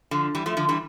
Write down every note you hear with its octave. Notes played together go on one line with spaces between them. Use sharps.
D3 F3
E3 G3
F3 A3
D3 F3
E3 G3